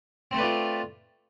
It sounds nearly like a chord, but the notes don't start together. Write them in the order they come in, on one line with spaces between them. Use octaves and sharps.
C4 A3 B4 D5 F4